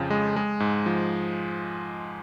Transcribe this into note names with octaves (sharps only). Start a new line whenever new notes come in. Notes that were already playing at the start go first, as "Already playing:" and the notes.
Already playing: F2 C#3 F3
G#3
G#3
G#2
F3